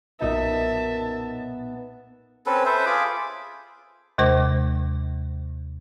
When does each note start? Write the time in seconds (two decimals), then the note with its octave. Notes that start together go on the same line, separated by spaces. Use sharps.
0.21 B1 F#2 A#2 B3 D#4 E5 A5
2.46 C4 C#4 A4 B4
2.66 A4 B4 C5 E5
2.86 F4 G#4 B5 D6
4.18 D#2 C3 G#3 C5 D6